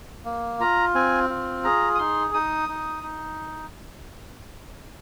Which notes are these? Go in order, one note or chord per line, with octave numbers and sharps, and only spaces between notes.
A#3
F4 A#5
C4 G#5
F4
G#4 A#5
D#6
D#4 C6
D#4 D#6
D#4
D#4